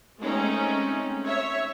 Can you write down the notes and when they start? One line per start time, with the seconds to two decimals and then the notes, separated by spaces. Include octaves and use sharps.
0.22 G#3 A3 C4 C#4 D#4
1.25 C#5 E5